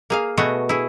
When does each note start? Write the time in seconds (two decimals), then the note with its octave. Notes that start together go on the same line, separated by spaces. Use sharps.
0.10 A#3 G#4 F5
0.37 B2 A3 B3 F#4 G#4
0.69 E4 G#4